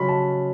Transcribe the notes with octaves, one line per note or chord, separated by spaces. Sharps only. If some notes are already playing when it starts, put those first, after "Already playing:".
Already playing: C#3 F#3 C#4 B5
A5